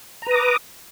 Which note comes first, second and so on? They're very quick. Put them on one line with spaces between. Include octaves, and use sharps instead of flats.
A#5 B4 D#6 D6